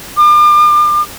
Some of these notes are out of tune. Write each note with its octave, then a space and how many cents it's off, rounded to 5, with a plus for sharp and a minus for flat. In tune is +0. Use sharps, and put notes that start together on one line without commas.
D6 +40